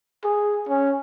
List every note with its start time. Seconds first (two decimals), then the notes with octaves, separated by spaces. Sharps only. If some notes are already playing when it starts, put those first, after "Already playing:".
0.24 G#4
0.69 C#4